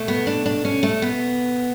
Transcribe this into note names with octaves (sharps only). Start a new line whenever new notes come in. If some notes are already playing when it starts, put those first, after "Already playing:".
Already playing: B2 A3
B3
D4
D4
C#4
A3
B3